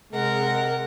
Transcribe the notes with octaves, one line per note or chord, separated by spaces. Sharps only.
C3 G#3 A#4 F#5